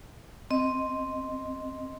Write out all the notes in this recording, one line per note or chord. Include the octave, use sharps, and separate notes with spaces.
C4 D#5